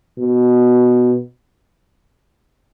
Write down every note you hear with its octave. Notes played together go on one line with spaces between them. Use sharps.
B2